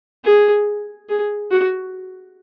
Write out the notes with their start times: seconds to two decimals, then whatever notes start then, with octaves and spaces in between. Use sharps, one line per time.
0.25 G#4
1.09 G#4
1.51 F#4